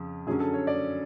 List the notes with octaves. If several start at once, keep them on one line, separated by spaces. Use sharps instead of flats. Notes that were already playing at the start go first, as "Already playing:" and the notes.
Already playing: F2 C#3 F3
F#2 D3 F#3 C#4 G#4
A4
C#5
D5